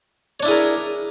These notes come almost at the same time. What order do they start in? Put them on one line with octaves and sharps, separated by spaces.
C#5 D4 E4 G#4 A#4